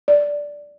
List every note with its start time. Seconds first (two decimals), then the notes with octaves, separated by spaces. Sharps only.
0.08 D5